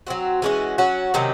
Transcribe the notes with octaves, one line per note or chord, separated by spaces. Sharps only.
F#3 C4 F#4
E3 G#3 C#4 F#4
F#3 C#4 F#4
C3 D#3 F#3 C#4